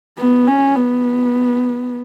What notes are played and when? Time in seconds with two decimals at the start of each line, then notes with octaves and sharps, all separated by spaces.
0.18 B3
0.47 C#4
0.75 B3